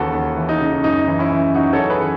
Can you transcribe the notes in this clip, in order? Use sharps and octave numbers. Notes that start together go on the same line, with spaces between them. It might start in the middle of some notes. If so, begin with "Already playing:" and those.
Already playing: D#2 C#3 E3 F#4 A4 B4
D#2
E3
D#4
C#3
F#2 D#4
E3
C#4 E4
E3
F#2 D#4 F#4
A4 C#5
F#2
G#4 B4
E3